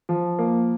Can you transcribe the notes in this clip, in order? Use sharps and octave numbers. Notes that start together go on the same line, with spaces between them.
F3
A#3